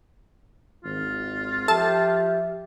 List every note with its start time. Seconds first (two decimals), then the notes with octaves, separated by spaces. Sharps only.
0.84 G#1 F4
1.68 F3 G4 A4 E5 A5